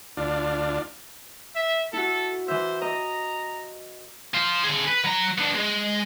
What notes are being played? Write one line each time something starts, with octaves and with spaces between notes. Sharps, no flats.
D2 D4 F4
E5
E4 F#4 A4
E3 C5 E5
D#5 A#5
C5 F5
D3 G#4
B4
F#3 A#5
B3 D4
G#3